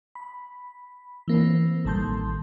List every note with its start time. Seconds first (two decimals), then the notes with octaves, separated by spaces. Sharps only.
0.15 B5
1.28 E3 A#3 C4
1.85 A1 D#3 G3 A5 C6 G6